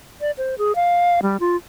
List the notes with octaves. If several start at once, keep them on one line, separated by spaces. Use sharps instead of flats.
D5
C5
G#4
F5
G3
F4